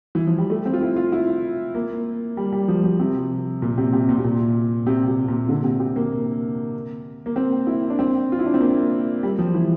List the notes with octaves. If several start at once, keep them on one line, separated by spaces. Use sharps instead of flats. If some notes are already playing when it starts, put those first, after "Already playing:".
E3
F3
G3
A3
C4
F4
E4
F4
E4
A#3
G3
G3
F3
F3
C3
A#2
C3
C3
A#2
C3
A#2
C3
C3
A#2
D3
C3
C3
A#3
A#3
C4
E4
D4
C4
F4
E4
D4
C4
A#3
G3
F3
E3